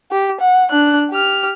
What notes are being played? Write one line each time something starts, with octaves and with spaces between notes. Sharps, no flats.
G4
F#5
D4 F#6
G4 F6